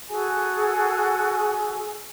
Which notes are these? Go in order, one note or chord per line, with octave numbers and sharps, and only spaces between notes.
F#4 G#4 A4 G#5